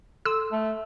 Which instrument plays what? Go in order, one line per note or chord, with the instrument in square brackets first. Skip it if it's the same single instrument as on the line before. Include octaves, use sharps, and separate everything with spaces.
[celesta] A4 C6 [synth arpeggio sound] E6
[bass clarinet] A3